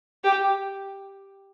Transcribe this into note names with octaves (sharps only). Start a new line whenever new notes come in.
G4